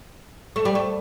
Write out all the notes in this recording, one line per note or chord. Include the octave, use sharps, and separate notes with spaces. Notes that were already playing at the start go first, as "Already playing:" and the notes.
A3
G3
A3